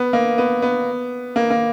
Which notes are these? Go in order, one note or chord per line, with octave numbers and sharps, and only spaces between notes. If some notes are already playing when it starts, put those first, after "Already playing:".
Already playing: B3
A#3
B3
B3
A#3
A#3